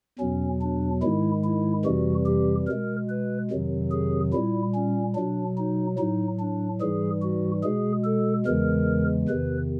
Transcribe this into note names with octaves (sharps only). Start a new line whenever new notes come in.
E2 B2 F#3 C#4
D4
G#2 D#3 G#3 E4
E4
F2 C3 E3 G3 F#4
G4
B2 G#3 A#4
B4
F2 C3 D#3 F#3
G#4
A#2 G3 E4
C#4
B2 F#3 D4
D#4
A2 F#3 D#4
D4
G#2 E3 G3 G#4
F#4
B2 G#3 G#4
A4
E2 C#3 E3 G#3 A#4
E2 C3 D#3 B4